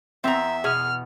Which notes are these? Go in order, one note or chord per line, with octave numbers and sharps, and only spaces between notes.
E2 C4 E5 A#5
B2 G#4 F6